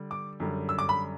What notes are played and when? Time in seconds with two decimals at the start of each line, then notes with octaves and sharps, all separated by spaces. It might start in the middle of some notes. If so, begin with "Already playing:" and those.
Already playing: D3 G3
0.11 D6
0.40 F#2 D3 G3
0.69 E6
0.78 D6
0.89 B5